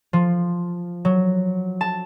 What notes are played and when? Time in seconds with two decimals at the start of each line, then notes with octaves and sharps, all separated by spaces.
0.13 F3
1.05 F#3
1.81 A5